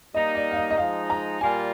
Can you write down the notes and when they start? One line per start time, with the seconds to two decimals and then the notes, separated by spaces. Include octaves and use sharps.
0.14 G3 A#3 D#4 D#5
0.35 D5
0.51 F5
0.56 D#5
0.71 D#5
0.77 F3 G#3 D#4 F5
1.10 A#5
1.41 A#2 G3 A#3 F4 G#5